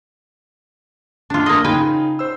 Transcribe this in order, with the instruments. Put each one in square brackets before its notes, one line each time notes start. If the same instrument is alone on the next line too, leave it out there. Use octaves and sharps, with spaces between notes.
[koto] D4 F4
[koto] A#3 D#5 [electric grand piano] C6
[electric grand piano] C#3 D#4 C6 [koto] B4 G5 G#5
[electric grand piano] C5 E6